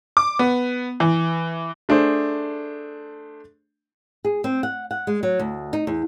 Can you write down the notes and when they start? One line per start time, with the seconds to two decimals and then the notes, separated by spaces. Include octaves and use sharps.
0.17 D6
0.39 B3
1.00 E3
1.89 A3 D4 G#4 C5
4.25 G#4
4.44 C4
4.63 F#5
4.91 F#5
5.07 G#3
5.23 F#3
5.39 D2
5.73 D#4
5.87 E2